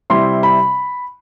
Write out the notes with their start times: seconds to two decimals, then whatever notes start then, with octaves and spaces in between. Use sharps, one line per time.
0.10 C3 G3 C4 E4 C6
0.43 B5